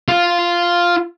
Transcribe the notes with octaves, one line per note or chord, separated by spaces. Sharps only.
F4